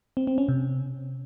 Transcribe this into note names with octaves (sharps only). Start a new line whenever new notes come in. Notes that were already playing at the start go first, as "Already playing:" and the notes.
C4
C4
C#4
C3